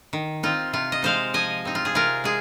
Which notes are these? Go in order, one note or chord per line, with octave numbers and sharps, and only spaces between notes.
D#3
C4 D#4 F4
C3 F4
D#5
G#3 D#4 C5 F5
F3 D#5 G#5
C4 D#4
F4
G#4
C3 F4 A#4
G#3 G#4